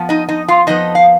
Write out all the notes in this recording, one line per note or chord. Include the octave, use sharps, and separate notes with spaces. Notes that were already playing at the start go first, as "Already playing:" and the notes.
Already playing: F2 F3 B3
D#4 D#5
D#4 D#5
F4 F5
F2 F3 B3 D#4 D#5
F5